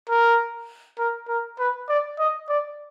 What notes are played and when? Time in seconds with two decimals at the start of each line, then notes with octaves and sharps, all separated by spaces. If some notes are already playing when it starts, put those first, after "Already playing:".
0.09 A#4
0.99 A#4
1.29 A#4
1.59 B4
1.89 D5
2.19 D#5
2.49 D5